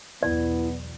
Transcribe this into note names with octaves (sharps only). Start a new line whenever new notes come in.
B1 E2 F#3 B3 E4 D5